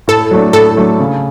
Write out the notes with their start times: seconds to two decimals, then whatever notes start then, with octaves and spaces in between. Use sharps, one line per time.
0.08 A2 A4
0.31 F#3 A3 D4
0.53 A2 A4
0.77 F#3 A3 D4
1.00 C#3